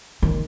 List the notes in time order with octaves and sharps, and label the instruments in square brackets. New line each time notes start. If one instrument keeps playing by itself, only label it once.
[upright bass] D#3